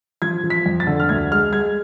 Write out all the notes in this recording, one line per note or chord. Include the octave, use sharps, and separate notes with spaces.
F3 G#6
F3
B6
F2
A6
D3
F6
D2 G#6
G#3 F6
G#3 G#6